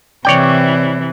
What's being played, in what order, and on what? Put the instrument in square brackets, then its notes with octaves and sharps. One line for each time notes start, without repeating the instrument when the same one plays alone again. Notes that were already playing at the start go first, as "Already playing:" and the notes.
[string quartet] C3 E3 [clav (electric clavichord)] C#5 D5 G5